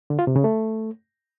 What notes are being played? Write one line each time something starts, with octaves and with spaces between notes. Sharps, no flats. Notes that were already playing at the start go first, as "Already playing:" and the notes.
D3
F4
C3
C#3
A3